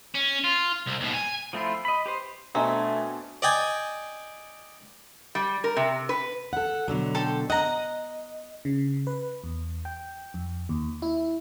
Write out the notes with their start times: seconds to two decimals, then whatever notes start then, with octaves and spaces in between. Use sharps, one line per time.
0.14 C#4
0.44 F4
0.87 C2
1.01 D#2 B2
1.14 G#5
1.53 F3 A3 C4 E4 F4
1.85 D#5 B5
2.06 G4 B4 C5
2.55 B2 A3 C4 D4 D#5 E5 G#5 A#5
3.42 D5 D#5 G5 G#5
5.35 G3
5.64 A#4
5.77 C3
6.09 B4
6.53 A4 F#5
6.88 B2 D3 F#3
7.15 A4 G5 C6
7.50 D#5 F#5 A#5
8.65 C#3
9.07 B4
9.44 E2
9.85 G5
10.34 F2
10.69 D#2
11.02 E4